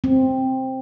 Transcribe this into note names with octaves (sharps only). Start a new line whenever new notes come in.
C4